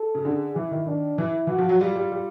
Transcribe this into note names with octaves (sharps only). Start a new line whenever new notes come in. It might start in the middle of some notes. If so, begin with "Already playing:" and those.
Already playing: A4
C#3
D3 G#4
E3 E4
D#3
D#3 D4
E3 E4
E3 F#4
F3
F#3
G3 F4
G3
G3